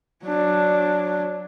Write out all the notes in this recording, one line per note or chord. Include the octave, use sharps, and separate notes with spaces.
F#3 D4